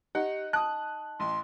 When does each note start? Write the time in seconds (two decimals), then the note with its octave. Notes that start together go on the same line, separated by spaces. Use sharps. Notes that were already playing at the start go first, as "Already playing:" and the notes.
0.15 D#4 G4 F#5
0.53 A5 D#6 F#6
1.20 A1 C6